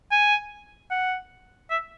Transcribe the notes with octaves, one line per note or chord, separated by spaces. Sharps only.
G#5
F#5
E5